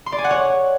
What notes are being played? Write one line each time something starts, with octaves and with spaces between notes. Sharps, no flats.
C6
D5
G#5
F#5
C#5